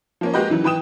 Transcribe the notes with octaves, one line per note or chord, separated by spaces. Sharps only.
F3 A#3 C#4
G#3 A#3 F#4 G4 B4 D#5
C#3 E3 F#3
E3 B4 G5 D#6 E7